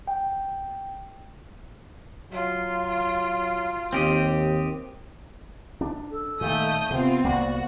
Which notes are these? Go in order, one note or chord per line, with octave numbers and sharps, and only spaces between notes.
G5
F#3 F4
D#2 C4 G4 D#5
D4
A4
A#2 D#3 A3 D#6 G6
C3 B3 C4 F4
C2 A#3 B3 F#4 D5